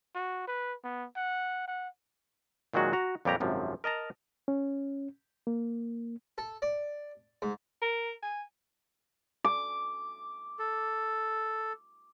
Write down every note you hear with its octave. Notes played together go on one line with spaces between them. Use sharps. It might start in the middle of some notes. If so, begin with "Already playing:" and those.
F#4
B4
B3
F#5
F#5
A#2 D#3 F#3 G#3 F#4
F#4 A#5
F2 A#2 G3 G4 C#5 A#5
G#1 F#2 C3 F3
A#4 D#5 A5 A#5
C#4
A#3
A4
D5
G#2
A#4
G#5
D6
A4